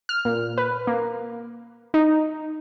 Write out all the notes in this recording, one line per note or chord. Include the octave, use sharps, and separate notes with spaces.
F6
A#2
B4
A#3
D#4